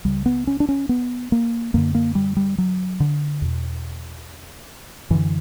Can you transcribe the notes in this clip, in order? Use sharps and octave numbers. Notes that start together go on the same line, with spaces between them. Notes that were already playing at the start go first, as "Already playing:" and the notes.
C#2 C#3 G3
B3
C#4
D4
C#4
B3
A#3
F#2 D3 A#3
A#3
G3
G3
F#3
D3
E2 B2
F#2 D3 E3